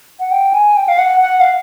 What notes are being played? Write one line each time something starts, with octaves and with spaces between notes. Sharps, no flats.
F#5
G5
G#5
G5
F5
F#5
F#5
F5